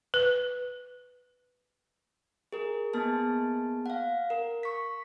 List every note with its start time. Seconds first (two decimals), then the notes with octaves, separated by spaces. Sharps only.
0.14 B4
2.53 G#4 A#4
2.94 A#3 B3 G#4 A5
3.86 F5 F#5
4.30 A#4
4.63 C#6 B6